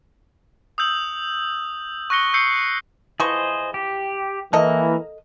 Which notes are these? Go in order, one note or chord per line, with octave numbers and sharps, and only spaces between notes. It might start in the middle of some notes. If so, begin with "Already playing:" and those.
D#6 E6 G6 F#7
C#6 F#6 A#6 C#7 G7
C#6 E6 G6 C7 C#7
E3 F3 G#4 C5 D#5 C#6
G4
E3 A#3 A4 A#4 D#5